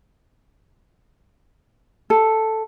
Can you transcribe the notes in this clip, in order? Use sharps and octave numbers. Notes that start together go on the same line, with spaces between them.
A4